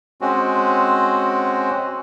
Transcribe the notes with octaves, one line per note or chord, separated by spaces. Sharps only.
G#3 C4 C#4 F#4